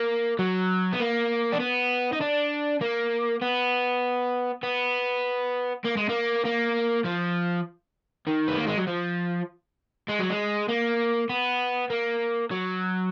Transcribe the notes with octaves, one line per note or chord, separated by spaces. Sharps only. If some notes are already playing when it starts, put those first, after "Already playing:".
Already playing: A#3
F#3
B3
A#3
D4
B3
D#4
D4
A#3
B3
B3
A#3
G#3
A#3
A#3
F3
D#3
B3
A#3
G#3
F#3
F3
G#3
F#3
G#3
A#3
B3
A#3
F#3